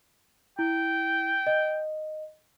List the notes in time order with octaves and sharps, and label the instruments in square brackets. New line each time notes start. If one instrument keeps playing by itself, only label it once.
[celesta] E4 [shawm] G5
[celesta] D#5